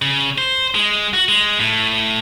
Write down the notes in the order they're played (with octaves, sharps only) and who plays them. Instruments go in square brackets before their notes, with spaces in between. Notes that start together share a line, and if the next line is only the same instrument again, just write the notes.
[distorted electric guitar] C#3
C5
G#3
F#4
G#3
A2